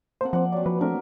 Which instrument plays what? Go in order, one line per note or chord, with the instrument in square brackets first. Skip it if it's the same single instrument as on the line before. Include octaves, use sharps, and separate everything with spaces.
[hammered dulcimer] A#3 A4 F#5 [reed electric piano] C4 C5
[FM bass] F3 [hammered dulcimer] D5 F#5
[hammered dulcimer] F#3 C4 [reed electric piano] D5
[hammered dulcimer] E3 [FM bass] F3 [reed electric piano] B4
[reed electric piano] A3 C4 D4 [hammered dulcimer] A#4 E5